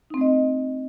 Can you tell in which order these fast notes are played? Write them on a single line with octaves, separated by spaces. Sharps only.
D#4 C4 A3 D#5